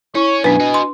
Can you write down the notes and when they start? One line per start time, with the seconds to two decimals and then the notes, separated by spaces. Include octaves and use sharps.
0.15 C#4 E4 C#5
0.44 F#2 B2 D4 B4 G#5
0.60 F#4 D#5
0.74 C6